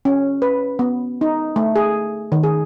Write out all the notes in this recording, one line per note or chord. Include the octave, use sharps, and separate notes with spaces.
C#4
B4
B3
D#4
A3
G#4
D#3
G#4